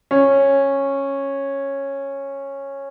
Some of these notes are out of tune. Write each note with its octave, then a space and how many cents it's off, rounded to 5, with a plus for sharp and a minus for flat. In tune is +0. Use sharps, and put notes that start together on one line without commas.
C#4 -10